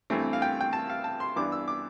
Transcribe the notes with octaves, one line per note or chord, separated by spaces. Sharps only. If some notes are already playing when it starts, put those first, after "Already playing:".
G2 E3 A3 C4
F5
G5
G5
A5
F5
A5
C6
G2 E3 B3 D4 D6
E6
D6